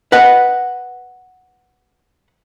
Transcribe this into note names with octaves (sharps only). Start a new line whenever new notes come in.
B4 D#5 F#5